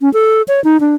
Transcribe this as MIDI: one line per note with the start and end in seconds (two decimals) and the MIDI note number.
0.01 0.12 61
0.13 0.42 69
0.48 0.63 73
0.64 0.80 63
0.80 0.95 62